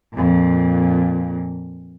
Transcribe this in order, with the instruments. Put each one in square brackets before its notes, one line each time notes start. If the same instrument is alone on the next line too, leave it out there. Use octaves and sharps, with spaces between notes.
[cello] F2 A#2